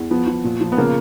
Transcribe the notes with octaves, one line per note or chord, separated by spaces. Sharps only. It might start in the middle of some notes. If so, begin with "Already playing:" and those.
Already playing: E2
F3 B3
F3
A#2
F3
B3
C#3 A#3